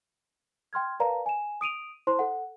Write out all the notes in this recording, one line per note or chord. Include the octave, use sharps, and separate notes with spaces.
G5 C6 F6 G#6
A#4 B4 D5 F5 A5 A#5
G#5 E7
D#6 D7 D#7 F7
E4 C5 A5 C6
A4 F#5